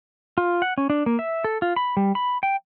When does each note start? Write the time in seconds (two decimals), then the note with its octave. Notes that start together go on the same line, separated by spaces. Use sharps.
0.38 F4
0.62 F#5
0.78 C#4
0.90 D4
1.06 A#3
1.19 E5
1.44 A4
1.62 F4
1.76 B5
1.97 G3
2.15 B5
2.43 G5